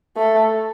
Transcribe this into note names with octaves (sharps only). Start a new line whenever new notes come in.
A3